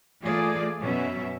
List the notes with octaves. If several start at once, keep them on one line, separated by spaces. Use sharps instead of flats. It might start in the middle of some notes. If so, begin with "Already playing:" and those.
E3 A3 A#3 F4 G#4 D5
F#2 B2 C#4 E5